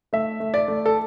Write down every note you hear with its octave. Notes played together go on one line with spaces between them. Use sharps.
A3 E5
A3
D5
A3
A4